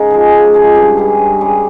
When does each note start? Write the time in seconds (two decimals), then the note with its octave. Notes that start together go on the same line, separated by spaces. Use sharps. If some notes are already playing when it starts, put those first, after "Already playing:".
Already playing: C#3 D#4 A#4 D#5
0.10 F3 G#3
0.32 C#3
0.54 F3 G#3
0.75 G2
0.97 G3 C#4 G#4
1.19 G2
1.40 G3 C#4 G#4